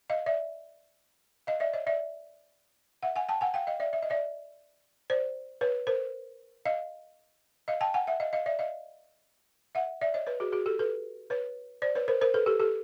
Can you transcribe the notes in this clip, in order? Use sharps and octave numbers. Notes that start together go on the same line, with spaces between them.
D#5 F5
D5 E5
D#5 F5
D5 E5
C#5 D#5
D5 E5
E5 F#5
F#5 G#5
G5 A5
F#5 G#5
F5 G5
D#5 F5
D5 E5
E5
D#5
D5 E5
C5 D5
B4 C#5
A#4 C5
D#5 F5
D#5 F5
G5 A5
F#5 G#5
E5 F#5
D#5 F5
D#5 F5
D5 E5
D#5 F5
E5 F#5
D5 E5
C#5 D#5
B4 C#5
F#4 G#4
F#4 G#4
G4 A4
A4 B4
B4 C#5
C5 D5
B4 C#5
A#4 C5
A#4 C5
A4 B4
G4 A4
G4 A4